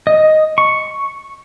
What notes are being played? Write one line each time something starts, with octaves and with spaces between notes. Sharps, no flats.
D#5
C#6